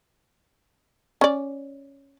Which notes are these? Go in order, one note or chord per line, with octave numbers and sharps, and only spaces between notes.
C#4 D5